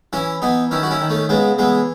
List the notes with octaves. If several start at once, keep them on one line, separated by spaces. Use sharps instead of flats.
E3 C#4 E4
E3 B3 D#4
D#3 C#4 E4
F#4
C#4 E4
D#3
A3 C#4
C#3 G#3 B3
E3 G#3 B3